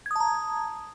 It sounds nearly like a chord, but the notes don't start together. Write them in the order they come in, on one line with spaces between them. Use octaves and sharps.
G#6 D#6 A5 A#5